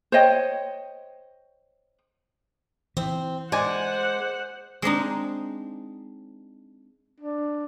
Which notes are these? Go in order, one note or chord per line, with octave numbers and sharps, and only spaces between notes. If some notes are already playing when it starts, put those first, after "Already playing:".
C5 C#5 D#5 G5
E3 C4
G#3 C5 D5 F#5 G#5
G#3 C4 D4 D#4
D4